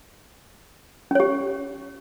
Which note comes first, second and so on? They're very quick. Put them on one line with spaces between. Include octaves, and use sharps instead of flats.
C#4 C#5 G4